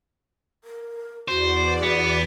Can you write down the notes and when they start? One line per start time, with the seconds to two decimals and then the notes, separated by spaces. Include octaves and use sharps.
0.64 A#4
1.28 E2 F#4 C5 D5
1.83 B3